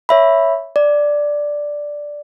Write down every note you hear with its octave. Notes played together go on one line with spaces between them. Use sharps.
C#5 E5 B5
D5